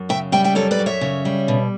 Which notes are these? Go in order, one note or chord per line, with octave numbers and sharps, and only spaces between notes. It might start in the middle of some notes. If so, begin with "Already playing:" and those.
Already playing: F#2
C#3 E5 G5
G3 E5 G5
E5 G5
F#2 A4 C#5
B4 D5
F#2
C#5 E5
C#3
G3
B2